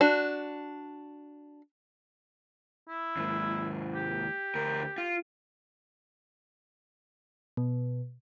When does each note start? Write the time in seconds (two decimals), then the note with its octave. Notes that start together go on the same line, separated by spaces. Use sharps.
0.01 D4 F#4
2.89 E4
3.17 D#2 G#2
3.95 G4
4.55 D2 A#4
4.98 F4
7.57 B2